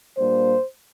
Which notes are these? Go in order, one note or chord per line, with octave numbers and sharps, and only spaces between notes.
A#2 G3 A#3 D4 C5